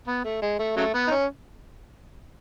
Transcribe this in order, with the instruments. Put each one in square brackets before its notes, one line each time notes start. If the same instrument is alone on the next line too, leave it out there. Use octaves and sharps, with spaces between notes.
[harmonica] B3
A3
G#3
A3
C#3 F#3 A3
B3
D#4
C#4